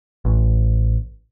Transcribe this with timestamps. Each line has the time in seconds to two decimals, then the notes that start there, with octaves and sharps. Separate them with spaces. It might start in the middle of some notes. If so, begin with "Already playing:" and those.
0.25 A1